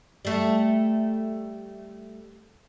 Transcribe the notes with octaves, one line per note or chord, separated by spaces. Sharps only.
G3 A3